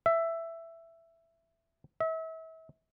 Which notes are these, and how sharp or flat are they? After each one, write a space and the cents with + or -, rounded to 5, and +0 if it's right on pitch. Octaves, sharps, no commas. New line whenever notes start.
E5 +10
E5 -35